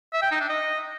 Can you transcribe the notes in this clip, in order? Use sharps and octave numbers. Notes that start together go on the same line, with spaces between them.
E5
G5
D#4
D4
D#5